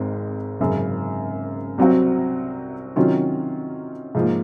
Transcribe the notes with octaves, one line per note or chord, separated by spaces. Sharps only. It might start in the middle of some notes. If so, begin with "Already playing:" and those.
Already playing: G#1 G#2 C4
G#1 F#2 C#3
C2 C3 F#3 C4 F#4
C3 D#3 F#3 C#4 F4
G#2 F3 A#3